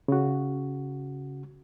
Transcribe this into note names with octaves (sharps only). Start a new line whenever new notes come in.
C#3 F#4